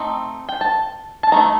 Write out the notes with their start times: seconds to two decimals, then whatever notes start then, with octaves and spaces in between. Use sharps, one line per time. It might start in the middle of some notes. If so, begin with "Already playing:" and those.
Already playing: A3 C4 D#4
0.49 G5
0.61 A5
1.23 A5
1.32 D#3 A3 D#4 A#5